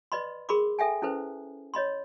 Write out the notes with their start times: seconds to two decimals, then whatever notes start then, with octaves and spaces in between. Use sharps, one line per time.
0.12 B4 D5 D#5 B5 C6
0.49 G#4 A#4 B5 C6 D6
0.79 A4 E5 G5 G#5
1.02 C#4 E4 A4 B4 C5
1.74 C#5 D#5 B5 C6